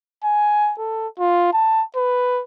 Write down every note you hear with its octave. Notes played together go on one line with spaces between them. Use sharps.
G#5
A4
F4
A5
B4